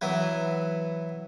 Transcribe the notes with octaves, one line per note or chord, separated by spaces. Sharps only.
E3 F#3 B3